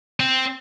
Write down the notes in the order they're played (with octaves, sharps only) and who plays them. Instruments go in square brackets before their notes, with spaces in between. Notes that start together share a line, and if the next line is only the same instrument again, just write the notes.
[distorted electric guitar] C4